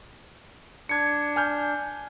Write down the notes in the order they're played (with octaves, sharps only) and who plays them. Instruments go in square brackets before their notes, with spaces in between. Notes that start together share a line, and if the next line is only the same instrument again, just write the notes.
[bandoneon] D4 [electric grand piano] G#6 C#7
[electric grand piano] G#5 F6 G6